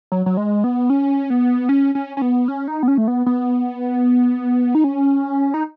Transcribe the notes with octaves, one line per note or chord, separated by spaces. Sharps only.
F#3
F#3
G#3
B3
C#4
B3
C#4
C#4
C#4
B3
C#4
D#4
B3
C#4
A3
B3
B3
D#4
C#4
D#4